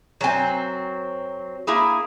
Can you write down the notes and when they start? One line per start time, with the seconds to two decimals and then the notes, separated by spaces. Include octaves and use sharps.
0.21 F#2 F#3 C4 G#5
1.67 A#3 E4 G#4